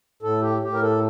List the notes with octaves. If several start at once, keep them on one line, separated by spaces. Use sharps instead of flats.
A2 A4
G4
A2 G4
A#4
A4